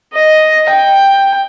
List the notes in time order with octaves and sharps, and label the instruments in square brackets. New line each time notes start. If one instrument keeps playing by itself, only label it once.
[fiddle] D#5
G5